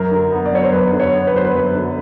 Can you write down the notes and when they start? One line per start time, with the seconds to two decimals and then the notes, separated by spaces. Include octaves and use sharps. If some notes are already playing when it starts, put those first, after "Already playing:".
Already playing: F#2 A#4
0.11 D3
0.31 B3
0.46 D5
0.52 F#3 C#5
0.63 C5
0.72 F#2 B4
0.92 D3
1.00 C#5
1.13 B3
1.27 B4
1.33 F#3 C5
1.45 B4
1.54 F#2
1.75 D3